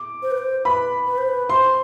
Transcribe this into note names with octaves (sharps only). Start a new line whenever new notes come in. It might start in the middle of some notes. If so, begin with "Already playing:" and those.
Already playing: D6
C5
B4
C5
B4 B5
B4
C5
B4
C5 C6